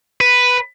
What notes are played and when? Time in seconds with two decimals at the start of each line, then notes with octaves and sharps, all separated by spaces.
0.21 B4